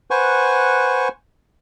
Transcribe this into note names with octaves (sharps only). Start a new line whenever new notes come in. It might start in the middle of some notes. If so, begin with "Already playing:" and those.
B4 C5 F#5 G#5 C#6